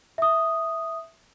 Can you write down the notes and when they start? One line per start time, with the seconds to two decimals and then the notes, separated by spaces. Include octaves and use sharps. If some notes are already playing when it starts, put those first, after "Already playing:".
0.18 E5 D#6